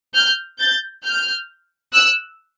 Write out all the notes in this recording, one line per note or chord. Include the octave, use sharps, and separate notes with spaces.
F6 G6
G6 A6
F6 G6
E6 F#6